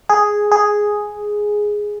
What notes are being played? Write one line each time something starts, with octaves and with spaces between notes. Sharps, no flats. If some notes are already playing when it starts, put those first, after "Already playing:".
G#4
G#4